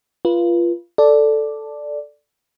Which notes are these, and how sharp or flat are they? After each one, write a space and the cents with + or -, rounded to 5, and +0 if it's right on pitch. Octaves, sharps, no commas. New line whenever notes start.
F4 -20 B4 -25
A4 +0 D5 +0